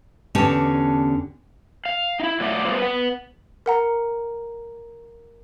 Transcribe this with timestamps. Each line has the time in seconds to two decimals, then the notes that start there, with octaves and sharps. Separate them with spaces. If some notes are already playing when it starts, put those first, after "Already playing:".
0.35 E2 D3 C#4 D4 G4 A5
1.86 F5
2.20 D#4 E4
2.40 F#3 A3 F4 D5 E5 F#5
2.65 G3 A3 B3 F4 A4 C5
2.78 B4 F#5
3.66 A#4 F#5 A#5